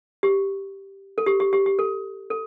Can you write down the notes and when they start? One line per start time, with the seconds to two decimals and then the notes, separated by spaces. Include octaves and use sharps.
0.23 G4
1.18 A4
1.26 G4
1.40 G4
1.53 G4
1.66 G4
1.79 A4
2.30 A4